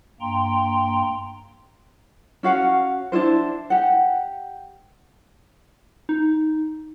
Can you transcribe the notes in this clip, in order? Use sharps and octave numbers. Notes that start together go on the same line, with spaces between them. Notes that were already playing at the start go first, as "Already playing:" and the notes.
G2 A#3 G5 A#5 C6
C#4 F#4 F5 F#5
D4 E4 F4 C5
G4 F#5
D#4